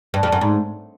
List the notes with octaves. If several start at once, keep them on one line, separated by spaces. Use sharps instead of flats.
G2
F2
F#2
G#2